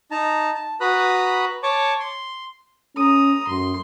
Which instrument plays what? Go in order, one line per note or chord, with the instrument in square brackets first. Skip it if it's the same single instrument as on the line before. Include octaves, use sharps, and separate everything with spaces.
[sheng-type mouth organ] D#4 A5 A#5
A5
F#4 B4 A#5 B5 D#6 F#6
C#5 A5 C#6 D6
C6
[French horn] C#4 [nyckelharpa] A#5 D#6
[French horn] F#2 [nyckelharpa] C6